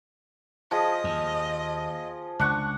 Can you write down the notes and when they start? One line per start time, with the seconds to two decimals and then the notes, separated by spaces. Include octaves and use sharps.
0.71 F3 G#4 D#5
1.04 D#2
2.40 C#2 D4 F#5 C#6